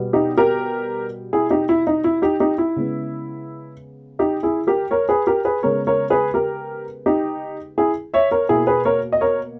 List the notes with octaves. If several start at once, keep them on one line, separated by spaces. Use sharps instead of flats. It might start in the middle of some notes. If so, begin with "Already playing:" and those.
Already playing: B2 G3 B3
D#4 G4
G4 A#4
E4 G#4
D#4 G4
E4
D#4
E4
D#4 G4
D#4 G4
E4
C#3 G#3 B3
D#4 G4
E4 G#4
G4 A#4
A#4 C#5
G#4 B4
G4 A#4
G#4 B4
C#3 G#3 B3 A#4 C#5
A#4 C#5
G#4 B4
G4 A#4
D#4 G4
E4 G#4
C#5 E5
A#4 C#5
B2 A#3 E4 G#4
G#4 B4
A#4 C#5
D#5
A#4 C#5